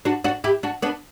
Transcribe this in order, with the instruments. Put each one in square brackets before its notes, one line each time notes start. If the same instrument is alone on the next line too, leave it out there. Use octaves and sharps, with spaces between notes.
[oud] D4 F#4
D4 F#4
E4 G4
D4 F#4
B3 D4